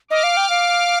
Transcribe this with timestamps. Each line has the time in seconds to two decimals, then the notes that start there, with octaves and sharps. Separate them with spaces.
0.11 D#5 D6 F6
0.23 F5
0.37 G5
0.50 F5